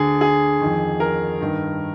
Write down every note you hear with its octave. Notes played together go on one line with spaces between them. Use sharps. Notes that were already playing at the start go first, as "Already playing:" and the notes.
Already playing: D2 D3 G#4
G#4
F2 D#3
A#4
G2 D#3